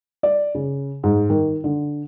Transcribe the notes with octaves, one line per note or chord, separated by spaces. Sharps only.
D5
C#3
G#2
D#3
D3